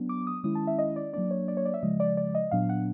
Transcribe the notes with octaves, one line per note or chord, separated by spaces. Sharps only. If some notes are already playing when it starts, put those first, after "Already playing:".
Already playing: F#3 B3 D4
D6
D#6
D#3 G#3 C#4 E4 D#6
A5
E5
D#5
D5
F#3 A#3 D4 D5
C#5
D5
C#5
D5
E5
C#3 F3 G#3 D#5
D5
D5
D#5
A#2 F#3 B3 D4 F5
F#5